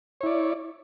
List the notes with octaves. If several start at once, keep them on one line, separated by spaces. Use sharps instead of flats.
E4 C#5 D5